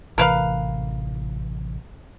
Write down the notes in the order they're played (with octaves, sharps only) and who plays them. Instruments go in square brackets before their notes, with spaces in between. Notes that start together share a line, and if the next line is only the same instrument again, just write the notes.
[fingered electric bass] A1 C3 E3 [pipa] A#4 B4 F5